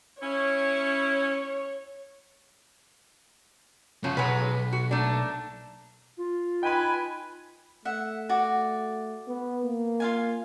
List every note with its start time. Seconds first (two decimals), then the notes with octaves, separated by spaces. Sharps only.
0.22 C#4 E4 C#5
4.04 C#3 F3 C#4 F#4
4.17 B1 F#3 G#3 B4
4.72 F#4
4.91 A3 A#3 D4
6.18 F4
6.63 D#4 B4 G5 G#5 B5
7.85 A3 E5 F#5
8.29 F#4 D5
9.28 B3
9.64 A#3
10.00 F4 F5 G#5